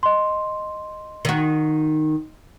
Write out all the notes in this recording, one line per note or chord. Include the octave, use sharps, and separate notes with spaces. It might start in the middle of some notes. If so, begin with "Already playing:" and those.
D#5 C6
D#3 F#4